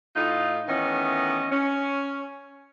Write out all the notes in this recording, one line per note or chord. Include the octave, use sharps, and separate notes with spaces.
A2 D#4 F4
D#3 E3 A3 B3 C#4 D#5
C#4